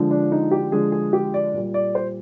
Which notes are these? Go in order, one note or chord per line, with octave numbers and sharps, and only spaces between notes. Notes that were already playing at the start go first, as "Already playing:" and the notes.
Already playing: D3 F3 G#3
D4
D#4
G4
D3 F3 G#3 G#4
G#4
G4
D5
A#2 G3
D5
C5